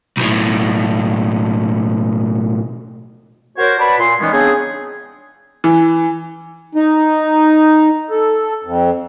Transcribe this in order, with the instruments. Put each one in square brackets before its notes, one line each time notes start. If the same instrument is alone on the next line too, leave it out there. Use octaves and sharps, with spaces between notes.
[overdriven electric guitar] B1 A2
[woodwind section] F#4 A#4 C5 C#5
B4 D5 F#5 A5 B5
A#2 C6
D#3 E3 G3 G#3 B3 C#4
C#3 B3 C4 D4 D#4 G#4
[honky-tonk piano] E3
[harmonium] D#4
A4
F2